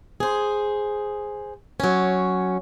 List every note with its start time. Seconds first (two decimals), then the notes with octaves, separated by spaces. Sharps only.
0.20 G#4 C5
1.80 F#3 C#4